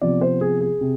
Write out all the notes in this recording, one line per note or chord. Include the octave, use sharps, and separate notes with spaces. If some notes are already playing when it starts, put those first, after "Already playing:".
C3 F3 B3 D5
C5
G#4
G#4
C3